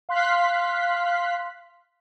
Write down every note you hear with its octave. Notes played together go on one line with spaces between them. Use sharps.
F5 C6 F#6 B6